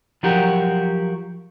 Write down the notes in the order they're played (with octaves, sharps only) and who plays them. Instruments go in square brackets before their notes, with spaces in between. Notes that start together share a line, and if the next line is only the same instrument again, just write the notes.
[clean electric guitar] F3 F#3 F#4 G4 A#4